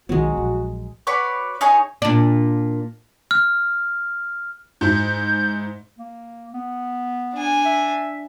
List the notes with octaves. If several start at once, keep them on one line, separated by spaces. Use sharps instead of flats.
B1 D#3 F#3 G#3 B3 F#4
A#1
F#4 B4 C#5 D5
D#4 G#4 C#5
A#2 D4
F6
G#2 E4 G6
A#3
B3
D4 G#5
E5